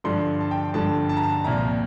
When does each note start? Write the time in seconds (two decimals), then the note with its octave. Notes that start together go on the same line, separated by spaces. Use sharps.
0.04 G2 D3 F3 C6
0.41 A5
0.51 G5
0.74 G2 D3 F3 A5
1.09 A5
1.17 A#5
1.23 A5
1.44 C2 A#2 F3 A#5